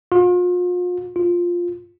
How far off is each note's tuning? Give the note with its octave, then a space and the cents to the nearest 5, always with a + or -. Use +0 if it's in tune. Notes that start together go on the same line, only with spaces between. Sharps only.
F4 +40
F4 +5